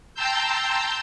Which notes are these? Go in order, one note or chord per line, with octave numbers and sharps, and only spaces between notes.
G5 A5 A#5 C6 E6 G6